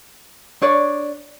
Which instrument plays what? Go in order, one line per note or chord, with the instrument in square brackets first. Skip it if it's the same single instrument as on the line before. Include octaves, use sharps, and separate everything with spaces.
[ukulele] D4 C#5 D5